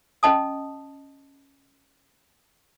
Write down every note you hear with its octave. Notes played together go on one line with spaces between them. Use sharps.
C#4 D#5 A5 D#6